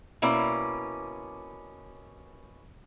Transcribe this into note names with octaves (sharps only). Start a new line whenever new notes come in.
B2 A#3 C#4 E4 D5